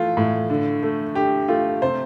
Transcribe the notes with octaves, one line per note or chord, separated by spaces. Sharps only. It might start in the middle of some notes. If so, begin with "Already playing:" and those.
Already playing: E3 A3 F4
A2
D3
A3
D3 G4
A3 F4
C3 C5